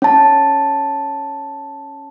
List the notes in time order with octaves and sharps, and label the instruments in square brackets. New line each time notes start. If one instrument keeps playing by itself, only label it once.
[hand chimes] C#4 A5